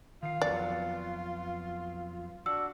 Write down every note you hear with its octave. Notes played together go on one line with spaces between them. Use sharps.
D#3 F4 F5
F2 F#3 B3 D5
D4 F#4 E6